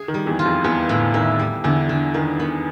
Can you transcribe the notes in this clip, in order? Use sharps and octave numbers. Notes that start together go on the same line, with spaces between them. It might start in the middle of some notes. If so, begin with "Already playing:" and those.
Already playing: G#4
D#3
G3
E2 E3
F4
F2 F3
E2 E3 B3
A2 D3
D#3 E4
G3
E2 D3 E3
D3
D#3 B3
B3